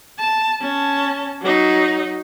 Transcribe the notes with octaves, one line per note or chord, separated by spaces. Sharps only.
A5
C#4 A5
F#3 D#4